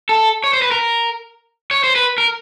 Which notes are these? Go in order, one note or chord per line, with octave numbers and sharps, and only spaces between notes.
A4
C#5
C5
B4
A#4
C#5
C5
B4
A#4